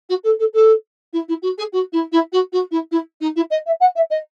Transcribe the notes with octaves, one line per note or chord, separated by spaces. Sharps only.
F#4
A4
A4
A4
E4
E4
F#4
G#4
F#4
E4
E4
F#4
F#4
E4
E4
D#4
E4
D#5
E5
F#5
E5
D#5